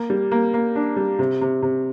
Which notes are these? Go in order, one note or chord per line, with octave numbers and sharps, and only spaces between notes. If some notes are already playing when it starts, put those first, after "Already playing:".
Already playing: A#3
G3
A#3
A#3
D4
G3
C3
C3
C3